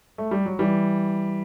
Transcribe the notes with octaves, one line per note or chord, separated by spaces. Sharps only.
A3
G3
F#3
E3 G3